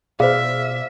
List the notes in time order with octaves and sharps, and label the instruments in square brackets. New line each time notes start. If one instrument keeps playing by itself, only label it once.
[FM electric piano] B2 D5 [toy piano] G#4 C5 [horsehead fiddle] E5 [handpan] F5